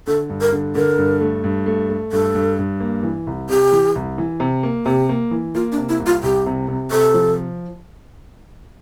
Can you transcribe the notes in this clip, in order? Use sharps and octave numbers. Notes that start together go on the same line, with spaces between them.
D3 A4
G2
A#4
D3
D3 A#4
G2
A3
G2
A3
A3
G2 A4
G2
G2
A#3
E3
C2
C3 G4
E3
C2
E3
C3
A#3
C3 G4
A#3
E3
A#3 F4
D4
C3
E4
C2
F4
C2 G4
C3
C3
C3 A4
F3